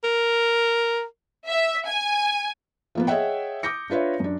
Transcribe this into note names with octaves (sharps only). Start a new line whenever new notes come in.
A#4
E5
G#5
F3 A#3 B3
G#4 C#5 D#5 E5 F#5 G5
D6 D#6 G6 A#6 C#7
D4 F4 B4 C#5 E5
F#2 D4